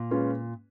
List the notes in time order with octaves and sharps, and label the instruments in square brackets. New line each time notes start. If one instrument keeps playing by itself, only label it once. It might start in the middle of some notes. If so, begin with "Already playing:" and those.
Already playing: [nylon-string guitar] A#2
[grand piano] G#3 C#4 F4 B4